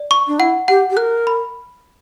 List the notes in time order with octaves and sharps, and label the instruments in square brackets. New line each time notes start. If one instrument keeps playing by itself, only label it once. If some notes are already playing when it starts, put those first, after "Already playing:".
Already playing: [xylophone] D5
C#6
[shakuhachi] D4
[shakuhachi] E4 [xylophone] F#5
[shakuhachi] G4 [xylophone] F#5
[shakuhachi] G4
[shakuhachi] A#4 [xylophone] F#6
[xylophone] B5